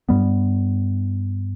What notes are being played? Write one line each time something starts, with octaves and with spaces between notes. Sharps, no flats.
G2 G3 B3